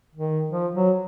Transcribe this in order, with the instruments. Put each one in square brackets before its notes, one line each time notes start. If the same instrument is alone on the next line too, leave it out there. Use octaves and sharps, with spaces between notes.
[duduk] D#3
F3
F#3